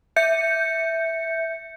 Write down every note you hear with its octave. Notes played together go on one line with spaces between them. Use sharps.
E5 G6 C#7